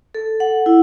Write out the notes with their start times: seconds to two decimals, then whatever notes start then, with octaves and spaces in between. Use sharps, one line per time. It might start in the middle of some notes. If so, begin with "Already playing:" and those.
0.15 A4
0.40 F#5
0.66 E4